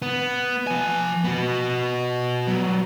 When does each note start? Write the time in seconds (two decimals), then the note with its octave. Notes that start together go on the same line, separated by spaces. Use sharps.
0.02 B3
0.67 F3 G#5
1.25 B3 F#4
2.47 F#3 G3